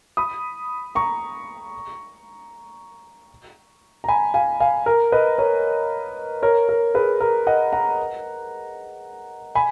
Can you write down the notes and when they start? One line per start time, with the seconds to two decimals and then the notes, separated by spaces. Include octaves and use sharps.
0.17 B5 D#6
0.95 A#5 C#6
4.04 A#5
4.08 G#5 B5
4.34 F5 G#5
4.60 F5 G#5
4.86 A#4
5.12 B4 D#5
5.38 A#4 C#5
6.42 A#4 C#5
6.69 A#4
6.94 G#4 B4
7.20 A#4
7.47 D#5 F#5
7.73 F#5 A#5
9.55 G#5 B5